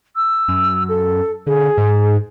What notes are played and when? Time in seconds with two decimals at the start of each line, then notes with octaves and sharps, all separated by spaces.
0.16 E6
0.48 F#2
0.89 A4
1.46 D3 G#4
1.77 G#2